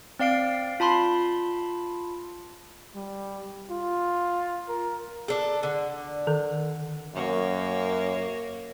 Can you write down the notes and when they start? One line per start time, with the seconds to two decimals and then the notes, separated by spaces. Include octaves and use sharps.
0.19 C4 D5 F5 C7 D7
0.80 F4 A5 B5 C6
2.96 G3
3.71 F4
4.69 A#4
5.28 D4 G#4 A4
5.63 D3
6.27 D#3 A4
7.15 F#2 A#3 C#5